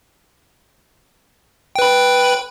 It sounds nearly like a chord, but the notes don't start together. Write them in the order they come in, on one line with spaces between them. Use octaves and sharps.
G5 B4 B5